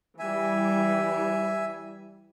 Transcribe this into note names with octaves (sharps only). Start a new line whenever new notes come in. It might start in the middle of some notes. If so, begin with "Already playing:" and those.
E3 G3 E5 G#5